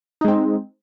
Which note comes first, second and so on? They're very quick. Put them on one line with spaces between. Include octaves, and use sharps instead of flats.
D#4 G#3 C4